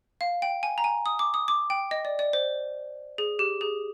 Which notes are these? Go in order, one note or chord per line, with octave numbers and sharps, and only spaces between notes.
F5
G5
G#5
A#5
G#5
D#6
D6
D#6
D6
G5
D#5
D5
D5
C5
G#4
G4
G#4